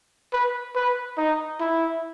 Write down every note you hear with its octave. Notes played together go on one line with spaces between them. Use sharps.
B4
B4
D#4
E4